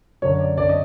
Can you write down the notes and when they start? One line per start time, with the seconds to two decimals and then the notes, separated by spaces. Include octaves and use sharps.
0.22 F#2 D3 C#5
0.40 D5
0.57 F#2 D3 D5
0.69 D#5